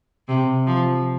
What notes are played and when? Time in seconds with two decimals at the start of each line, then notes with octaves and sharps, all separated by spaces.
0.28 C3
0.67 F3